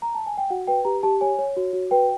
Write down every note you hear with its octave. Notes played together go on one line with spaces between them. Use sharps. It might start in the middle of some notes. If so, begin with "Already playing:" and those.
A#5
A5
G#5
G5
F#4 F#5
B4 G5
G4 A#5
G4 A5
C#5 G#5
C#5
F#4
F#4
B4 G5